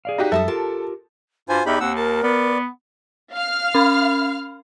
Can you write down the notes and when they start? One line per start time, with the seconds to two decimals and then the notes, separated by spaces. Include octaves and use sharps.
0.05 G#4 D5 F5
0.18 D#4 F#4 G4
0.32 F#2 G3 A4 E5 A5 D#6
0.48 F4 G4 A#4 A5
1.49 G2 F4 F#4 C5 G#5
1.66 E2 D#4 G4 E5 B5
1.80 D#2 C4 F#5 E6
1.96 A#4 A5
2.23 B3 B4 D5
3.33 F5 F6
3.74 C#4 B5